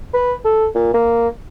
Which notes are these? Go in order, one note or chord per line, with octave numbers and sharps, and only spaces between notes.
B4
A4
A#2
A#3